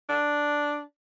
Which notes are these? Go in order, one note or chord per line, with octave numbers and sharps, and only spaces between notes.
D4